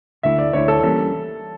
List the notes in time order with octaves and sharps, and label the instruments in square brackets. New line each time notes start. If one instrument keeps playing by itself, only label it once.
[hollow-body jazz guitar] D2 D3 A3 E4 [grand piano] E5
[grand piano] D5
[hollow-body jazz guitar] D2 D3 A3 E4 [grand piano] C#5
[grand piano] A4
[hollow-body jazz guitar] E3 G3 A#3 C#4 [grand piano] A4